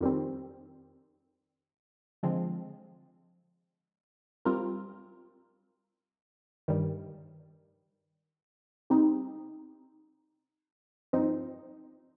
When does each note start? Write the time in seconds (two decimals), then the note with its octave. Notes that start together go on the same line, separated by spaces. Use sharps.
0.01 F2 D#3 G3 C4
2.23 D3 F3 G#3 C4
4.45 G3 C4 F4 A#4
6.68 G2 D#3 G3
8.90 C3 G3 C4 D#4
11.13 G2 F3 C4 D#4